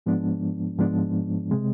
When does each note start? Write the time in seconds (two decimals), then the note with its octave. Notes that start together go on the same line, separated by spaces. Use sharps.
0.06 G#2 F3 G#3 B3 D4
0.79 G#2 F3 G#3 B3 D4
1.51 C3 G#3 C4